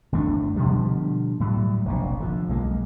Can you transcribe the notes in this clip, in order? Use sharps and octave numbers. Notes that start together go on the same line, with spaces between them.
G1 E2 A3 D4
B2 D3 F3 G3
A2 F#3 G3
F1 A#1 B2
D3 F3
B1 G#3 A#3